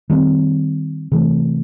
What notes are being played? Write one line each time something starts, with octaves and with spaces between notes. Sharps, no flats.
D#3 G3 C4
C3 E3 A3